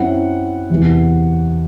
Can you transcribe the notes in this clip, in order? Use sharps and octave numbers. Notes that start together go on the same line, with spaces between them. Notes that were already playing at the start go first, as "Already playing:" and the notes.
Already playing: F#2 F#3 C4 E4 F#5
E2 C3 E3